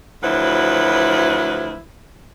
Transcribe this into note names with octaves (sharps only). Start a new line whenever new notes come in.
D2 F3 F#3 E4 B4